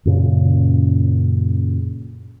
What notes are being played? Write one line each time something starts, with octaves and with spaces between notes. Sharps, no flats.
F#2 A#2 C#3